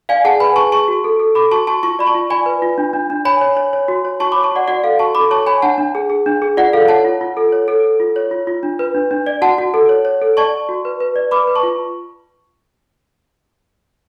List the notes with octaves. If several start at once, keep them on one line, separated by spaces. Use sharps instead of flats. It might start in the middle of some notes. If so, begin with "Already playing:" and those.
D5 F5 G#5
G#4 F#5 A5
B4 G#5 B5
G#4 A5 C#6
G#4 A5 C#6
F#4
A4
A4
A4 B5 D6
F#4 A5 C#6
F#4 A5 C#6
F4 A5 C#6
D5 B5
A5 C#6
F4
D5 G#5 B5
B4
F4
D4
D4
D4
C#5 G#5 B5
C#5
C#5
C#5
F#4
C#5
F#4 A5 C#6
C#5 B5 D6
A5 C#6
F#4 D5 F#5
F#4 D5 F#5
A4 F5
F#4 A5 C#6
A4 B5 D6
C#5 A5 C#6
C#5 G#5 B5
D4 F#5 A5
D4
G#4
G#4
D4
G#4
F4 D5 F#5
A4 F5
C#5 F#5 A5
F4
F4
A4
C#5
A4
A4
F4
C#5
F4
F4
D4
B4
D4
D4
D5
F#4 F#5 A5
F#4
A4
C#5
C#5
A4
D5 A5 C#6
D5
F#4
B4
B4
D5
B4 B5 D6
B4
A5 C#6
F4